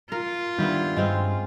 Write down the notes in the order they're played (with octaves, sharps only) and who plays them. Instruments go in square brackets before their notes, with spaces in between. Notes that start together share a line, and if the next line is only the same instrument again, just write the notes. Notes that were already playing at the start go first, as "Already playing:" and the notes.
[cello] F4 [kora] A#4
[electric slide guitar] D#3 G3 D4 [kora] B3 E4 G4
[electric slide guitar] G2 [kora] G#3 C4 C#4